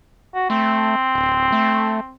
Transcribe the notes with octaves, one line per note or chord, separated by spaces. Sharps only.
F#4
A3 C4
D1
A3